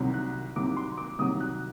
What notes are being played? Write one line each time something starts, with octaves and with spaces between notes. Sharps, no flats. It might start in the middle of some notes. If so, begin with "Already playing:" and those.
Already playing: C2 C3 D#3 F#3
F#6
C2 C3 D#3 F#3 D6
C6
D6
C2 C3 D#3 F#3 D#6
F#6